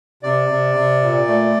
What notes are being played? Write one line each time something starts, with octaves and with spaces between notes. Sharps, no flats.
C3 D5
C3
C3
A#2
A3